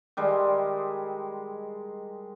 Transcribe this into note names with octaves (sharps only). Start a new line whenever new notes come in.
D#3 G3 G#3